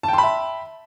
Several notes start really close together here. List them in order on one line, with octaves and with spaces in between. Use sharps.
A5 G5 C6 B5 E5